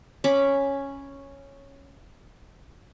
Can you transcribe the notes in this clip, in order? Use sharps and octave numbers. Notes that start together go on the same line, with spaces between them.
C#4 B5 D6